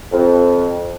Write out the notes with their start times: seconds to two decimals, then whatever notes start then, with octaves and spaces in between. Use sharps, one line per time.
0.12 F2